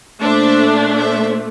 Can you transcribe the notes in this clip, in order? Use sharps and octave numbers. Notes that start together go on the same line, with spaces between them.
A#2 A3 D4 C5 E5
C5 E5